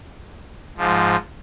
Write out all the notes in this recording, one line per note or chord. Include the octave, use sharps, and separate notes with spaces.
G#2 F3